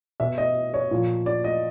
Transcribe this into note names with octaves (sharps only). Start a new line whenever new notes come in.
B2 E5
D#5
C#5
A#2 F3
D5
D#5